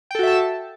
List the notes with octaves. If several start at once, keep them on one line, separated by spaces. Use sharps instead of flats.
F#4 A4 E5 G5 A5